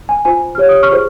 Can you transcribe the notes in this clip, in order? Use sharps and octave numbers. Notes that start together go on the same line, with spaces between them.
G#5
F4 C5 G#5
G4 C#5 F6
D#6
C#6 F6
F4 G#4 C5